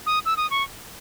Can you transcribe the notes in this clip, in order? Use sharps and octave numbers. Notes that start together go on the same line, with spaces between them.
D#6
E6
D#6
C#6